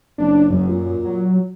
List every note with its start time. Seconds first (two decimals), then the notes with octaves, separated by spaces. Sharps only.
0.18 F#1 D4
0.50 F#2
0.69 A#2
1.05 F#3